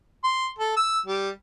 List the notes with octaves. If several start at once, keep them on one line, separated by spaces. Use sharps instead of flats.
C6
A4
E6
G3